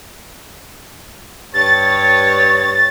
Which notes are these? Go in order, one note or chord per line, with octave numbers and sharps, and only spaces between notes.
G2 C#5 A6